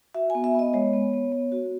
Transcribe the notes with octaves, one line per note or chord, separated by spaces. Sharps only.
F#4 E5
B3 G#5
E5
B3
D#5
G#3 C#5
B3
B3
B3
F#4